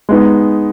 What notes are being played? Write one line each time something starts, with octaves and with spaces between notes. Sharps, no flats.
G#3 B3 D#4